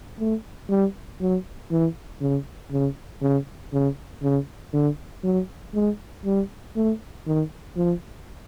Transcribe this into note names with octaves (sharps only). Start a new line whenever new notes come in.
A3
G3
F#3
E3
C#3
C#3
C#3
C#3
C#3
D3
F#3
G#3
G3
A3
D#3
F3